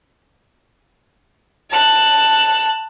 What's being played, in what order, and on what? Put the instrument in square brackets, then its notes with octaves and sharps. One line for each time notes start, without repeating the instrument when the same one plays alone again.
[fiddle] A5 F#6